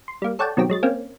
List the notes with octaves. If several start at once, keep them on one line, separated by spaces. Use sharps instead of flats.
C6
G3 A#3
A4 C#5 D5 F#5 G5 A5
B2 D#3 F#3 C4 G4
F#3 G#3 A6
A#3 C4 C#4